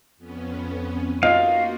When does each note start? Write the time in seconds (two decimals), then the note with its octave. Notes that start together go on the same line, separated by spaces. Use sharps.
0.17 F2 B3 C#4
1.23 A#3 D#4 F4 F#4 F5